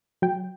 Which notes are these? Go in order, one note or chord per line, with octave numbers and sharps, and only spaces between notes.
F#3 G5